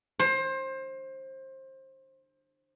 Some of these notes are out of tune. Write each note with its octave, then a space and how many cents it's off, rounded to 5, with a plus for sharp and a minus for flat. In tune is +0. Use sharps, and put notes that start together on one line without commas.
C5 +25